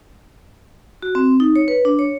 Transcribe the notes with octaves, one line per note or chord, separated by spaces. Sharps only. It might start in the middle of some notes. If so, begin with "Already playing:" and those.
F#4
C4
D#4
C#5
B4
D4
C#5